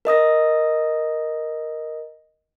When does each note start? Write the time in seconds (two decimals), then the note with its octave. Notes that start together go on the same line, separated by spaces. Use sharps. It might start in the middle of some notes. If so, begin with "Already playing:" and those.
0.05 A#4 D#5 D#6 A#6